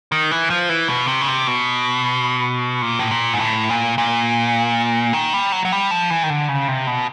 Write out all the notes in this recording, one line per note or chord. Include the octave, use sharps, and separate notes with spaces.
D#3
E3
F3
E3
B2
C3
C#3
C3
B2
A#2
A2
A#2
G#2
A2
A#2
A#2
D#3
G3
F#3
F#3
G3
F3
E3
D#3
D3
C#3
C3
B2